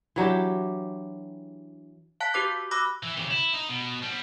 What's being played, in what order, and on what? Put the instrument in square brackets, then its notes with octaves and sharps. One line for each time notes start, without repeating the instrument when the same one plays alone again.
[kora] E3 F#3 D4 G4
[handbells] F5 A5 F#6 B6
F#4 G4 B4 D6 G6
B5 D6 E6 F#6 A#6
[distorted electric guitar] E3
C#3 G4
E4
D#4
B2
G3 B3